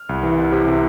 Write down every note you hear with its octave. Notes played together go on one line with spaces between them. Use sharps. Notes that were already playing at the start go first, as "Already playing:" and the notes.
Already playing: F6
C2
E3
C2
C3
C3